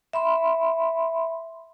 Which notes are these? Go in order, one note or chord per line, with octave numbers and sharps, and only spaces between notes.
E5 B5 C6